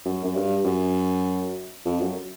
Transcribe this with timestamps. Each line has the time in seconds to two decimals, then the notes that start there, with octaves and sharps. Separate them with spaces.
0.05 F#2
0.24 F#2
0.35 G2
0.64 F#2
1.86 F2
2.01 F#2